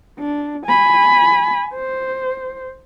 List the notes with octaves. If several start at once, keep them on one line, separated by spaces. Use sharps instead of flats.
D4
G#5 B5
C5